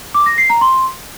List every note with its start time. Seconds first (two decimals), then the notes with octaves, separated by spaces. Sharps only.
0.14 D6
0.26 A#6
0.38 C7
0.50 A#5
0.61 C6